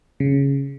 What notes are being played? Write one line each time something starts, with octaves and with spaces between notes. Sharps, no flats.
C#3